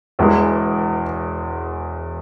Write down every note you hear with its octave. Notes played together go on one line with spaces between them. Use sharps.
E1 E2 E3 G#3